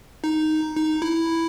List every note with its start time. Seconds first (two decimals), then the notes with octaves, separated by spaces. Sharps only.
0.24 D#4
0.76 D#4
1.02 E4